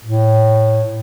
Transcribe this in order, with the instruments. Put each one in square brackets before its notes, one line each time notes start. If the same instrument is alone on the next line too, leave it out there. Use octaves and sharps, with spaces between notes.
[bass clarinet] A2